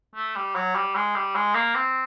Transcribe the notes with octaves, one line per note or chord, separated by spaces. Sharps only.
A3
G3
F#3
G3
G#3
G3
G#3
A#3
C4